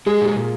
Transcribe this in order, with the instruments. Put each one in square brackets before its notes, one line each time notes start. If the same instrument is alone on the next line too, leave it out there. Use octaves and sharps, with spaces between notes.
[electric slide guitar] G#3 [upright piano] G#4
[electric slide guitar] A#2 [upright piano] G#4
[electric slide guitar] A#2